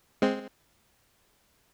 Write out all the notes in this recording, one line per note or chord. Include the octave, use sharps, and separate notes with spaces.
G#3 C4